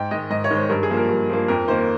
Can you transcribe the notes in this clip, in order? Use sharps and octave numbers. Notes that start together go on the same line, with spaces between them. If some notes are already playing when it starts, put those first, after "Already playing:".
Already playing: G#2 G5
D#3 G#3 D#5
G#2 D#5
C#5
D#3 G#3
C5
G2 A#4
G#4
F3 A#3
A#4
G2
F3 A#3
F2 A#4
D#3 A#3 C5